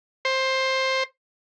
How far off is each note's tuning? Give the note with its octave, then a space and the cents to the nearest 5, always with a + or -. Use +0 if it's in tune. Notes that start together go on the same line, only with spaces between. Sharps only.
C5 +15